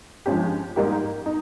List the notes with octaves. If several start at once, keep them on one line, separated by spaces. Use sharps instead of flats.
G2 F3 G#3 C#4 G4
G#2 G3 A#3 D#4 G4
D#4